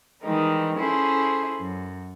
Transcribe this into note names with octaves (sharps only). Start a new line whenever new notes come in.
D#3 E3 G3 G#3 D#4
C#4 E4 G#4 A4 C5
F#2